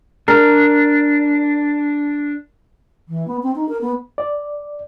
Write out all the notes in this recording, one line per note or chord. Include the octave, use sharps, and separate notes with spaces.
D4 A#4
E3
B3
C4
D#4
A#4
B3
D5